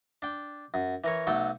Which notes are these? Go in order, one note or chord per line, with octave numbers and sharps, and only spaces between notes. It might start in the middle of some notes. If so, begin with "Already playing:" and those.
D4 G5
F#2
E3 A#4 C#5
B1 F#3 A3 A4 G5